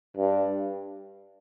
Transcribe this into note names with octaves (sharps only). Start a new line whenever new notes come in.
G2